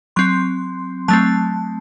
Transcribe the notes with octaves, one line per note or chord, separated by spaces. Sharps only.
F#3 C4 C6
F#3 A3 C4 A5